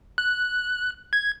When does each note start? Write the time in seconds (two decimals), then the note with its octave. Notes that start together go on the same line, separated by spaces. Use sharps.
0.18 F#6
1.13 G#6